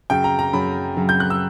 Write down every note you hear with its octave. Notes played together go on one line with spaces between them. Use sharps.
F#2 C#3 F#3 G5
A#5
A#5
F#2 C#3 F#3 B5
F#2 C#3 F#3
G6
F#6
E6